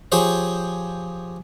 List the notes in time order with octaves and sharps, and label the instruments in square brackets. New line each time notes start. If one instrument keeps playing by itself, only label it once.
[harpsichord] F3 G4 G#4 C5 C#5